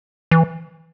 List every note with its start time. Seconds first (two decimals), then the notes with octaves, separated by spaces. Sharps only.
0.31 E3